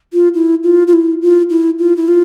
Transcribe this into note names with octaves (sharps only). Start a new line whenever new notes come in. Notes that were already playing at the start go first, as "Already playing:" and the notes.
F4
E4
F4
F4
E4
F4
E4
F4
E4
F4